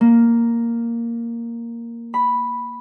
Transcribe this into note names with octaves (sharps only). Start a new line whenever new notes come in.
A#3
B5